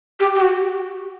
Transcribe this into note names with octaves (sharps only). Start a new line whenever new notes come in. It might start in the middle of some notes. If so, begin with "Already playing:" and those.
G4
G4
F#4